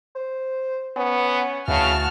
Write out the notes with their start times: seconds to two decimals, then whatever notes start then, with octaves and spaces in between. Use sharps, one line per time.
0.15 C5
0.96 B3 C#4
1.68 D2 C#3 E3 F#4 A5 F6